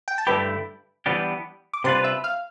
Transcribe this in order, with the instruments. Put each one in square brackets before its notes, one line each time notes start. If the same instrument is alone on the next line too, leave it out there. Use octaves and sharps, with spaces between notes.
[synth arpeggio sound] G5
A5
[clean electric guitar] G2 D3 A3 E4 G4 [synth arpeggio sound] B4 B5
[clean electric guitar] E3 G3 B3 D4 G4
[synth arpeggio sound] D6
[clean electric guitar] C3 G3 D4 F4 B4 [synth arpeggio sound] C5 C6
[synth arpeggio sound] E5 E6
F5 F6